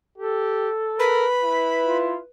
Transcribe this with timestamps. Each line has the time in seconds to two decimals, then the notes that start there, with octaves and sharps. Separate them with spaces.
0.18 G4 A4
0.99 A#4 B4 B5
1.43 E4
1.82 F4